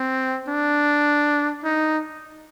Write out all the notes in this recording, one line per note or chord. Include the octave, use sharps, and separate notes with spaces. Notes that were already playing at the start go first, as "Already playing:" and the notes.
Already playing: C4
D4
D#4